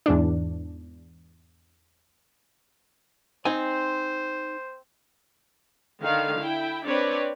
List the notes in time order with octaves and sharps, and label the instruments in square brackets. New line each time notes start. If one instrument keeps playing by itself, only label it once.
[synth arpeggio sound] E2 G#2 D4
[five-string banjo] C4 [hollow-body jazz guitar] D#4 G#5 [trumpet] C5
[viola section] D3 D#3 F5
E4 G5
C4 D4 B4 C#5 D5